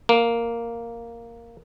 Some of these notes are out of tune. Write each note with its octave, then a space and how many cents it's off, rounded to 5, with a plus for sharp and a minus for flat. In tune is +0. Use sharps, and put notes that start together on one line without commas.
A#3 +0